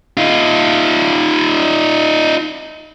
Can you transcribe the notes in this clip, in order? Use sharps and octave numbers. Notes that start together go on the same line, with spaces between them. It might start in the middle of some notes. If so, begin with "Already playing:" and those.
D#4 F4